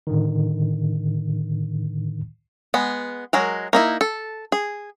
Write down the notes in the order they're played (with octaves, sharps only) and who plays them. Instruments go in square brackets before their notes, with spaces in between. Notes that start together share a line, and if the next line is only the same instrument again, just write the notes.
[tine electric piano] A2 D3 D#3
[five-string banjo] G#3 B3
F#3 G#3 A#4
A#3 D#4 E4
A4
G#4